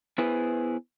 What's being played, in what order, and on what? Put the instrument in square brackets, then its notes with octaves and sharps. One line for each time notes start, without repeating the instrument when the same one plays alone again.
[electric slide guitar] B3 E4 G#4 B4 C5